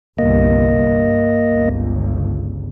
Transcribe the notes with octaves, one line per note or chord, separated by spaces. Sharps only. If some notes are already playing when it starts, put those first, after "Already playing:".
G1 C2 C3 A#3 D#5
G2
G1 C#2